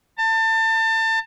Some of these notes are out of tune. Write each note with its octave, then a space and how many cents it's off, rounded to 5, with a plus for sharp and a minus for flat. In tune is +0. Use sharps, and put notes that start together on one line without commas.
A5 +30